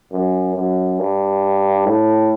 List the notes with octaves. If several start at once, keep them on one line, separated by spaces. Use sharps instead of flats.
F#2
F#2
G2
A2